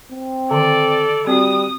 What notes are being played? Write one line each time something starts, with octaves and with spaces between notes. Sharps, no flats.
C4
D3 D#3 A4 D5
G3 C4 F#4 D5 D#6